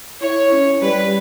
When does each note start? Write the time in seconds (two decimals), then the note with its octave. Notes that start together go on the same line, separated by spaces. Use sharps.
0.21 E4 C#5
0.52 C#4
0.81 G3 B4